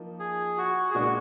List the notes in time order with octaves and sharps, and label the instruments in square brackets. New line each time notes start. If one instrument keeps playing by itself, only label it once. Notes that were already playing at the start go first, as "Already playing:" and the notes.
Already playing: [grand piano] F3 A#3 D#4
[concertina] G#4
F#4
G#4
[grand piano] A#2 G#3 D4 [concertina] F#4